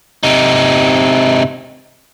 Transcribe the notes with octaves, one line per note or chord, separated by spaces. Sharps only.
C3 D#4